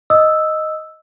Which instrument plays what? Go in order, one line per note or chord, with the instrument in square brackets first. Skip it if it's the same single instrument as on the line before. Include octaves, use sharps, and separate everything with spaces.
[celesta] D#5 D#6 E6